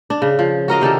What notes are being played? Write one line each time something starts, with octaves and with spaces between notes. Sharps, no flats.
D4
C#3
F3
F#4 A#4 D#5 F5
C3 D#3 D4 A4